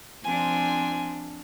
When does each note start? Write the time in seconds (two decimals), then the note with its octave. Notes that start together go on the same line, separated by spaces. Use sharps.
0.24 F3 C4 D4 G#5